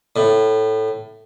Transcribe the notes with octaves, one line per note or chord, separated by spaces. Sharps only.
A2